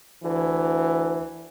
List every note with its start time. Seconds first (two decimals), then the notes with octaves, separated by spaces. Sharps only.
0.24 D2 E3